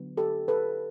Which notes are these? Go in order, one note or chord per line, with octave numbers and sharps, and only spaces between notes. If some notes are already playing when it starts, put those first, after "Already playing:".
Already playing: D3 F#3 B3
G4 A4
A4 B4